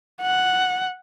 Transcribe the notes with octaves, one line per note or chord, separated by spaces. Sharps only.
F#5